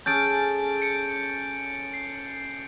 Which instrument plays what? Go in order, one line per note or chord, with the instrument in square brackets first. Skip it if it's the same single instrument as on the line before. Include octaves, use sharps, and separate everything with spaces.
[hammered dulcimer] C#4 G#4 A4 [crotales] G6 A6 D7
[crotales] C#7 D7
C7